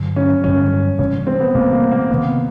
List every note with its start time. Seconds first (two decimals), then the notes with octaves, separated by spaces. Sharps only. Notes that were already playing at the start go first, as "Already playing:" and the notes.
Already playing: G2 D3 F#3
0.16 C#4
0.44 G2 D3 F#3 C#4
0.99 C3 E3 G3 C#4
1.27 C4
1.40 B3
1.55 C3 E3 G3 A#3
1.72 A#3
1.91 A#3
2.10 C3 D#3 G#3 B3